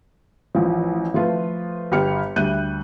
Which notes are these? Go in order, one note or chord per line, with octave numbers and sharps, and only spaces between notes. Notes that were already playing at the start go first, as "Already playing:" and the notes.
A1 F3
F3 A3 F4 B4
G1 G4 F6 C#7
D2 G3 E5 F#6 G6 D#7